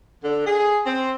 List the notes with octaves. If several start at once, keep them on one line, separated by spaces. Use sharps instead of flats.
D3
G#4
C4